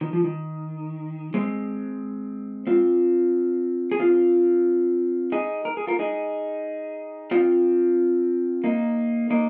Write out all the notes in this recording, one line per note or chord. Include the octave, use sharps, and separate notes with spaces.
D#3
F3
D#3
G#3 C4
C4 F4
G#4
C4 F4
D#4 G#4
A#4
G#4
F4 A#4
D#4 G#4
C4 F4
A#3 D#4
A#3 D#4